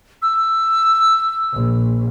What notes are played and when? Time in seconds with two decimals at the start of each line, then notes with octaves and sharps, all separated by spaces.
0.22 E6
1.53 A#1